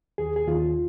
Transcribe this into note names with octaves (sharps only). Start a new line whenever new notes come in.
D#2 G#4
G#4
D#2 F4